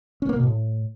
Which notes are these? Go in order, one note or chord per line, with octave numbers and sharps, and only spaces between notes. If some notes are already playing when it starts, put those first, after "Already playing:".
C#4
A#3
B2
A2